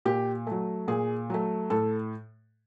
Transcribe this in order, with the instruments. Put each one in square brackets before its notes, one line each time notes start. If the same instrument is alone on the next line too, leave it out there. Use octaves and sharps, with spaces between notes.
[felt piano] A#2 G4
F#3 A3
A#2 G#4
F#3 A3
A2 A4